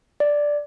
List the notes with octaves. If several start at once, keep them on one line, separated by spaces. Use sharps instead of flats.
D5